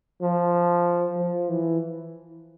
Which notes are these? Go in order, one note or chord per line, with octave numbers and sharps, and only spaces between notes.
F3
F3
E3